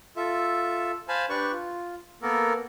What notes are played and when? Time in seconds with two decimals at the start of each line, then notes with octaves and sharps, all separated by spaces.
0.17 F4 A4 E5
1.08 C5 F5 G#5 A5 B5
1.29 D4 G4 B4 D5 C#6
1.52 F4
2.22 A#3 B3 A4 A#4